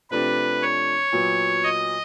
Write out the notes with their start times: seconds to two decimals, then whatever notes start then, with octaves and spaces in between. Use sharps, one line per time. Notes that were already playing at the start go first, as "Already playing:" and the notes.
0.11 C3 F3 A3 D4 G4 B4
0.62 C#5
1.12 A#2 F#3 B3
1.64 D#5